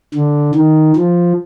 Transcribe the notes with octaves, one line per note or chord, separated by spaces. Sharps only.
D3
D#3
F3